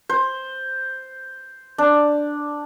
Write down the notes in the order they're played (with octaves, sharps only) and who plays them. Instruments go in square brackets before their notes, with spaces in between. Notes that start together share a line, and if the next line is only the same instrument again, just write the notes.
[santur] C5
D4